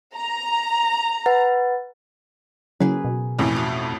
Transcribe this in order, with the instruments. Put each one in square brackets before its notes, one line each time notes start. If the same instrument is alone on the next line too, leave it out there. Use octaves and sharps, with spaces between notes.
[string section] A#5
[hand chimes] B4 F#5 A6
[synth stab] C#3 F#3 [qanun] A#3 G#4 B4 [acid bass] E4
[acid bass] B2
[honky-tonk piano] A1 F2 A2 [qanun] E3
[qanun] F#4 F5 B5